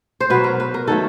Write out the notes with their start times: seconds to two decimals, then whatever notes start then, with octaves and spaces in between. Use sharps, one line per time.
0.20 C5
0.30 B2 F#3 B3 B4
0.44 A#4
0.60 B4
0.74 A#4
0.87 D#3 F#3 A3 A4